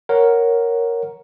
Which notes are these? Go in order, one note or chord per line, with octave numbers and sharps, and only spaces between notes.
A#4 C#5 F#5